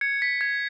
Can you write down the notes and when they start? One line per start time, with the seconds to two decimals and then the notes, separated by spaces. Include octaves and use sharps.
0.01 G#6 C#7
0.22 B6
0.41 G#6